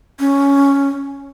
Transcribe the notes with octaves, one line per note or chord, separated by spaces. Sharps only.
C#4